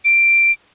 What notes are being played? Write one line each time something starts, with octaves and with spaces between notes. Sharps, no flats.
D7